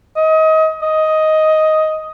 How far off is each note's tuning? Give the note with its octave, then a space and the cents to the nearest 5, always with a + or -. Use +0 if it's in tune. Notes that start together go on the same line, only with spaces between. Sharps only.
D#5 +30
D#5 +10